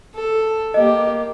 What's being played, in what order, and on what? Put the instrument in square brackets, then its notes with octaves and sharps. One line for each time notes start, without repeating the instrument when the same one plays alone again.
[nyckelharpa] A4
[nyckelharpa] A#3 G4 [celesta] D#5